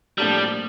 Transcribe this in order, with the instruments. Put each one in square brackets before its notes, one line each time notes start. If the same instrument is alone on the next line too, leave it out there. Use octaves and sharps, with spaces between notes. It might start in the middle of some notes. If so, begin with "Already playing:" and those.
[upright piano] A2 F3 A#3 D4 A4 [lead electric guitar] G3